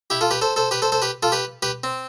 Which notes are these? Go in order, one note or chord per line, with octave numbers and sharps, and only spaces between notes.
E4 G4
F4 A4
G4 B4
A4 C5
A4 C5
G4 B4
A4 C5
A4 C5
G4 B4
F4 A4
G4 B4
G4 B4
C4